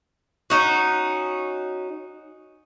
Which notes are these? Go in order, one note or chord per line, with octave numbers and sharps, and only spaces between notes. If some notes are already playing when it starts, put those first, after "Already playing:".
C#4 D#4 F#4